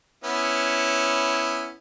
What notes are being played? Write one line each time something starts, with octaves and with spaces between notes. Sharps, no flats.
B3 C#4 E4